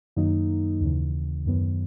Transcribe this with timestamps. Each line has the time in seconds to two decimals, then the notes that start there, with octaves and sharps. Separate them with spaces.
0.16 F#2 D#3 F#3 A#3 D#4
0.81 D#2 C#3 E3
1.45 F#2 D#3 F#3 B3